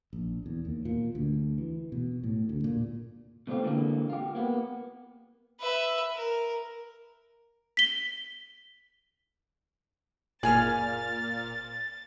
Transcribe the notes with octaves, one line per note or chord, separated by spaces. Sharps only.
A#1
E2
D#2
A#2
D2
E3
B2
A2
D2
A#2
B2 A3 C4 F4 G4
A#2 D3 E3 G3 G#3 A#3
F4 G4
A#3 B3
B4 E5
A#4
B6 G7
F#1 A#2 G#4 G#5 F6 A6